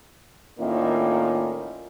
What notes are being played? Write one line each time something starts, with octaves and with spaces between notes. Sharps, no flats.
A2 D#3 A#3 C#4 D4 F4